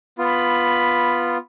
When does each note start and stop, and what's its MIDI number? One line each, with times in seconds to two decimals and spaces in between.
0.18 1.38 59
0.18 1.38 65
0.18 1.46 83